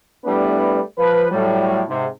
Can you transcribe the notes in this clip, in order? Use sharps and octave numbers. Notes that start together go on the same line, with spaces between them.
G3 A3 B3 D4 E4 B4
F3 B4
A2 F#3 G3
G#2 C3